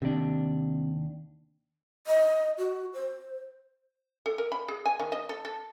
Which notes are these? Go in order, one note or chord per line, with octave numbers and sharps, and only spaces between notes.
D#2 C3 D4
D#5
F#4
C5
A4
A#4
B5
G#4
G#5
D#3
D#5
A4
A4